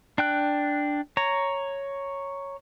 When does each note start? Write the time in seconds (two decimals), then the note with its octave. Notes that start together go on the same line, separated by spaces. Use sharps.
0.18 D4 G5 F#6
1.17 C#5 A#5